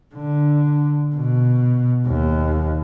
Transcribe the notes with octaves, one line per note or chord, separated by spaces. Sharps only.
D3
B2
D#2